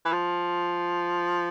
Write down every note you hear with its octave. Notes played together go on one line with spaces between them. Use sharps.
E3
F3